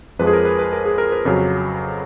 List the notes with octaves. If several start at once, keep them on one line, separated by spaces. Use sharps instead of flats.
F2 F3 G#3 B4
G#4
A#4
B4
B4
A#4
G#4
A#4
B4
F2 C#3 F#3